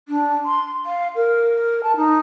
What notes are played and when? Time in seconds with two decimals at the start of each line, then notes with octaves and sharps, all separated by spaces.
0.08 D4
0.45 C6
0.85 F5
1.15 A#4
1.83 A5
1.96 D#4